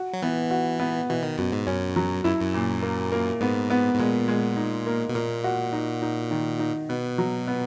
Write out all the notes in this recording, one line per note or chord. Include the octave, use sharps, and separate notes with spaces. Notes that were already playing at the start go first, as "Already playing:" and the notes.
Already playing: F#4
F#3
E3 B3
F#4
B3
B2 E3
D#3
F#2 B2
G#2
F#2 C#4
F#3
F#2 E4
F#2
A#2
A#3
A#3
G#2 B3
B3
G#2
A#2 G#3
G#3
D#4
A#3
B2
A#2 A#3
F#4
D#4
D#4
D#3
D#4
B2 B3
F#3
B3